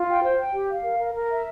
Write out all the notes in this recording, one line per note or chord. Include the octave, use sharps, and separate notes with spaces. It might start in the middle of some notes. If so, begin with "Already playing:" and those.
Already playing: F4
G5
C5
G5
G4
F5
A#4
A#4
A#4
E5